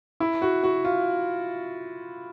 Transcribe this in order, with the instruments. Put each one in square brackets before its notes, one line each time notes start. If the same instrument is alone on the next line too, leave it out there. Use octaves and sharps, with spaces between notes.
[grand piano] E4
F#4
F#4
F4